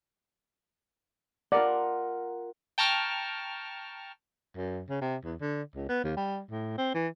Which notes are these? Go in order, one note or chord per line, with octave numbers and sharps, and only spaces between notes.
F4 A#4 D5 F#5
G5 A5 A#5 C#6 F6
F#2
C#3
C3
E2
D3
C#2
B3
D#2
G3
A2
C4
E3